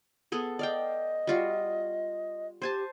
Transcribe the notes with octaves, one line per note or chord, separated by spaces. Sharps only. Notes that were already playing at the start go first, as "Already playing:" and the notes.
B3 G#4 A4
D5 D#5 F5 G5
G3 F4 F#4
G4 C5 G#5 A5